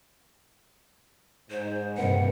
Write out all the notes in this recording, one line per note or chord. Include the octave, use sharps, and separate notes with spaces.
G#2 C5
G2 C3 A#3 C4 B4 F#5